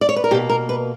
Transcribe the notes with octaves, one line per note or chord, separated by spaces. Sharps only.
D5
C#5
B4
A#4
B2 A#3 G4
A#4
B4